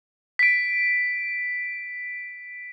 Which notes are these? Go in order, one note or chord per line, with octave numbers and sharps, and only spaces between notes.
B6 D7